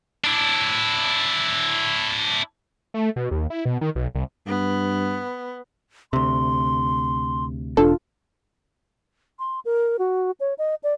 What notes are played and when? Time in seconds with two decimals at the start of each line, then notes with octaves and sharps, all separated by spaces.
0.24 D4 E4
2.94 A3
3.16 B2
3.31 D#2
3.50 E4
3.65 B2
3.81 D#3
3.96 B1
4.15 C2
4.47 G2 B3
6.13 D2 C3 C6
7.77 E1 D4 F4 A4
9.39 C6
9.65 A#4
9.99 F#4
10.40 C#5
10.58 D#5
10.83 D5